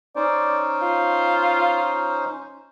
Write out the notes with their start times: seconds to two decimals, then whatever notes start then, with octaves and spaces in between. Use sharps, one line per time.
0.16 C#4 D#4 C5 D5
0.82 F4